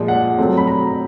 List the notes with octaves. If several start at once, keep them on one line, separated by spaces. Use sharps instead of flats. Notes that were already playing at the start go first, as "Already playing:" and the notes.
Already playing: A#2 F3 G#3
F#5
B2 F#3 A3 C4
B5
A#5